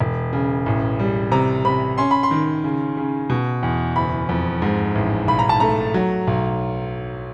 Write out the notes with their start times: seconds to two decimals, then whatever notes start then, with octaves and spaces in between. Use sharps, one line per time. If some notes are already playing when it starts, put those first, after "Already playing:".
0.01 E1
0.33 C#3
0.66 A1
0.99 G3
1.32 C3 A#5
1.65 C3 B5
1.98 C#4 C6
2.11 B5
2.23 C6
2.31 D#3
2.64 C#3
2.97 C#3
3.30 B2
3.63 E2
3.96 F#1 B5
4.29 F2
4.62 G#2
4.95 A1
5.28 B1 B5
5.39 A#5
5.49 A5
5.60 A3 A#5
5.94 F#3
6.27 B1